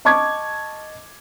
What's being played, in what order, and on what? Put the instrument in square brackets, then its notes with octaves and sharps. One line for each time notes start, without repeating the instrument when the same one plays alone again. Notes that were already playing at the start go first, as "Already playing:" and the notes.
[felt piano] D#5 A5 C#6 D6 G#6